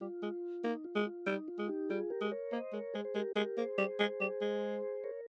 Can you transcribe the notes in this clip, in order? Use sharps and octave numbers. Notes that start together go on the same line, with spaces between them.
G3 F4
G#3
A#3 D#4
F4
G#3
F4
G3 D#4
F4
G#3
D#4 G4
G3 F4 G#4
G4 A#4
G#3
A#4 C#5
A#3 C5 D#5
G#3 A#4 C#5
G#3 G#4 C5
C5
G#3 G4 A#4
G#3 G4 A#4
A#3 G#4 C5
G3
G#3
G3
G#3
A#4 C#5